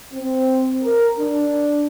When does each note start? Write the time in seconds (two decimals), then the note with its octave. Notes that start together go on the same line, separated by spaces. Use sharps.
0.13 C4
0.81 A#4
1.18 D4